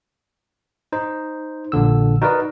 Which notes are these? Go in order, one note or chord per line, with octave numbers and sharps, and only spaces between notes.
D#4 C5
A#1 A#2 D3 E6
D#4 F#4 A#4 B4 D5 D#5